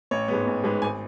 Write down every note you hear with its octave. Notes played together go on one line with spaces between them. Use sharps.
A1 C#5
G#2 G#3 B3
A1
G#2 G#3 B3
G#1 G#5